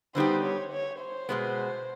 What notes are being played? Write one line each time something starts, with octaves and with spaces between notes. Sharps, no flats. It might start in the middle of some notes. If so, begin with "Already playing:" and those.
D3 G3 B3 D#4 G4 C5
C#5
C#5
C5
B2 G#3 B3